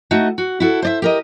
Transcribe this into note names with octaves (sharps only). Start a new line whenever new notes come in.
A3 D#4 F#4
F#4
E4 F#4 A4
C5 D5 E5
G4 A#4 D#5